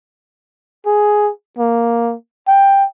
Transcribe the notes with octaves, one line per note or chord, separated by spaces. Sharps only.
G#4
A#3
G5